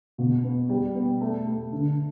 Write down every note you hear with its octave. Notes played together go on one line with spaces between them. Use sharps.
B2
B3
G3
B3
A3
A3
D3